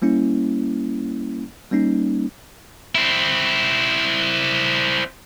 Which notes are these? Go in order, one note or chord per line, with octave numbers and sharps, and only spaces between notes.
G3 A#3 C#4 E4
G3 A#3 C#4 D#4
C4 E4